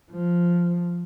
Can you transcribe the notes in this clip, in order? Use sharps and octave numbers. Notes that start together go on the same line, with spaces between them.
F3